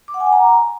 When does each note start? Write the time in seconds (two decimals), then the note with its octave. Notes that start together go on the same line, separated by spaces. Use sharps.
0.08 D6
0.14 F#5
0.20 G#5
0.26 F#5
0.32 A#5